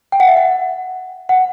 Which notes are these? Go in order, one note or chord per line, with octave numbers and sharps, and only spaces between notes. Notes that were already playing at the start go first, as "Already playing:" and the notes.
G5
F#5
E5
F#5
F#5